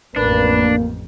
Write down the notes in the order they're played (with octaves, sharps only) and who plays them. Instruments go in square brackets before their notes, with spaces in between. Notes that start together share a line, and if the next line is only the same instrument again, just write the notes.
[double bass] A1 F2 [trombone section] A#3 [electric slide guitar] D4 [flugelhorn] B4